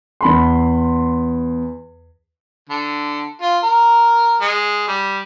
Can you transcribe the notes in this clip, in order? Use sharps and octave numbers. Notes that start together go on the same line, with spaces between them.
E2 B5 C6
D3
F4
A#4
G#3
G3